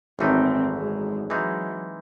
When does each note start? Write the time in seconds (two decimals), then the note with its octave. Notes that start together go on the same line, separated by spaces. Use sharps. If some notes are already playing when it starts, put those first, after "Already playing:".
0.19 G#1 F#2 E3 A3 C4 D#4
0.75 G#3
1.30 C3 E3 F#3 G#3 D#4 G#4